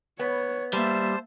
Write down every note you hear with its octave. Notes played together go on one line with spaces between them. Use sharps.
B3 C#5
G3 A#3 C5 E5 A5